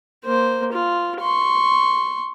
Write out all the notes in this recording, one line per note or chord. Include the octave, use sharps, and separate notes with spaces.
A#3 C5
F4
C6 C#6